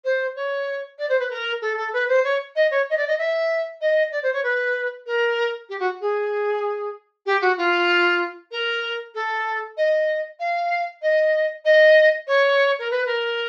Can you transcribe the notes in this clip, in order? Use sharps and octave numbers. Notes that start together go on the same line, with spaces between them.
C5
C#5
D5
C5
B4
A#4
A4
A4
B4
C5
C#5
D#5
C#5
D#5
D5
D#5
E5
D#5
D5
C5
C#5
B4
A#4
G4
F#4
G#4
G4
F#4
F4
A#4
A4
D#5
F5
D#5
D#5
C#5
A#4
B4
A#4